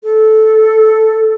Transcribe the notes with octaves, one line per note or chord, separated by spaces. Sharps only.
A4